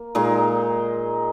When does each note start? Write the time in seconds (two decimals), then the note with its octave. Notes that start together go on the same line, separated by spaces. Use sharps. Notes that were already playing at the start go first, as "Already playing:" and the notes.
Already playing: A#3
0.15 A#2 G#3 D#4 G#4